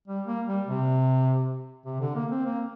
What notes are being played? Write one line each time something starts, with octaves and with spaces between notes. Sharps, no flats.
G3
A#3
G3
C3
C3
D3
A#3
C4
A#3